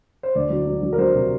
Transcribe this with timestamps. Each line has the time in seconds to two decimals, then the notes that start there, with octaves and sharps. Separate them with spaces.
0.23 C5
0.35 D2 D5
0.50 F#3
0.67 F#3
0.83 F#3
0.93 A#4
0.98 F#3 C5
1.14 C3